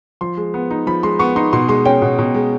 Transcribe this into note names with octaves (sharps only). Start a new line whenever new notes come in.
F3 C6
G#3
B3
D#4
F3 B5
G#3 C6
B3 C#6
D#4 C6
B2 C6
G#3 C6
C#4 G5
B2
B2
G#3